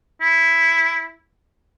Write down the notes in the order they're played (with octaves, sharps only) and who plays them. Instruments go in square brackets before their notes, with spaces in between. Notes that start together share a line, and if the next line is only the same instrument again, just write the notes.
[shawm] E4